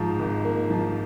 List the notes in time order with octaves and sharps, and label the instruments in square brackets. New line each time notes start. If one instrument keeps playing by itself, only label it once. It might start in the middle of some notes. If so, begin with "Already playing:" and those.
Already playing: [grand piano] G#2 F3
G#1
A#3
F3